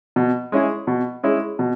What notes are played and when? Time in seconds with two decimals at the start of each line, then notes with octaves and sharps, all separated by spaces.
0.16 B2
0.52 G#3 C#4 E4 G#4
0.87 B2
1.23 G#3 C#4 E4 G#4
1.59 B2